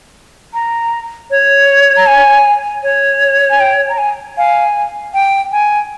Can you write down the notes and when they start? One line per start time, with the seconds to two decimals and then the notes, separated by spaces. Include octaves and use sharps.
0.54 A#5
1.31 C#5
1.97 A#5
2.07 G#5
2.83 C#5
3.50 G#5
3.60 G5
3.89 A#5
3.98 G#5
4.37 F5 G#5
5.14 G5
5.52 G#5